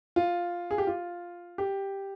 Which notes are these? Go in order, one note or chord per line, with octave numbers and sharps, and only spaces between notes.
F4
G#4
G4
F4
G4